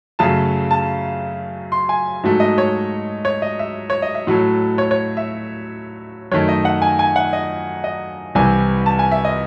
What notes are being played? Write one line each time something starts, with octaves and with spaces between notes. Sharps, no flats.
F#2 C#3 F#3 A3 A5
A5
C6
G#5
G#2 F#3 A3
D#5
C#5
C#5
D#5
E5
C#5
D#5
E5
A2 F#3 A3
C#5
C#5
E5
F#2 D#3 A3 C#5
D#5
F#5
G#5
G#5
F#5
D#5
D#5
C2 C3 E3 G#5
A5
G#5
E5
D#5